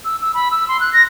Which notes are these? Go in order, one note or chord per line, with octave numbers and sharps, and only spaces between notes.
E6
E6
B5
E6
C6
F#6
A#6